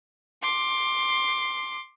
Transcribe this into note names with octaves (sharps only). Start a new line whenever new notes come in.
C6 D6